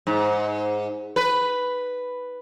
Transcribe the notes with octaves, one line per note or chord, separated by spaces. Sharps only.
G#2
B4